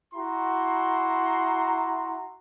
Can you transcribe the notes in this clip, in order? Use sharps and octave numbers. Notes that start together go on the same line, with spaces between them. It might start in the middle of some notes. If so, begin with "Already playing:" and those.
E4 F#4 A#5 C6